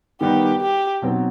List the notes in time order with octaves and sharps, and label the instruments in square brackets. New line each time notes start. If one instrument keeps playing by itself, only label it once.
[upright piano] D#3 G3 B3 D#4 [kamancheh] G4
[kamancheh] G4
[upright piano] B2 F#3 C4 D#4